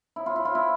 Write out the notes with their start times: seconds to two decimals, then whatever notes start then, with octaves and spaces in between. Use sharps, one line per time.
0.16 E4
0.26 F4
0.36 E4
0.45 F4
0.55 E4